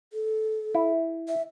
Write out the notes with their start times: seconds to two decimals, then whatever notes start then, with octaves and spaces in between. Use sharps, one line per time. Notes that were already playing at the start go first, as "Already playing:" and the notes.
0.13 A4
0.75 E4
1.28 E5